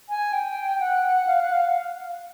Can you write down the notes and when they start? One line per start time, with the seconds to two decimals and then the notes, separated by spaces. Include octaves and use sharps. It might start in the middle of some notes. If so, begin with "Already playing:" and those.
0.09 G#5
0.33 G5
0.80 F#5
1.27 F5
1.40 F#5
1.53 F5